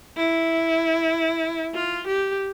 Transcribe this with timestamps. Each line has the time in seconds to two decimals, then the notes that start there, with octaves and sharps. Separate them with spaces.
0.17 E4
1.74 F4
2.07 G4